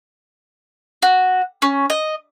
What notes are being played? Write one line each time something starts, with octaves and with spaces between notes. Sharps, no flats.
F#4
C#4
D#5